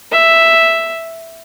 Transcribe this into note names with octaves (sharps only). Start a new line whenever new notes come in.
E5